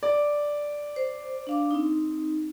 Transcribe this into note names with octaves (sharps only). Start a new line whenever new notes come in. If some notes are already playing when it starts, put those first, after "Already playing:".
D5
C5
D4 F5 D6
C4 D#4